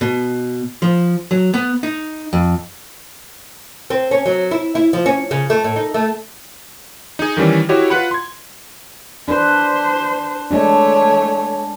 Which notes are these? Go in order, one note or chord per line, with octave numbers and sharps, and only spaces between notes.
B2
F3
F#3
B3
D#4
F2
C4
C#4
F#3
E4
E4
F3
C#4
C#3
A3
A2
D#4
A3
D#4 G#4
D#3 E3 G3 C#4
E4 F#4 G4 C#5 D#5
F4 B4 F#5 B5
C6 G#6
D4 B4 C5
G#3 A3 D4 C#5